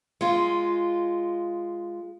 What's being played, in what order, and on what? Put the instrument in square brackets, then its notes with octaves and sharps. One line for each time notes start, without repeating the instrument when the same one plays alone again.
[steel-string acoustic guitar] G#3 F4